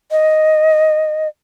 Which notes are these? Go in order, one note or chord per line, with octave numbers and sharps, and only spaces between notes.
D#5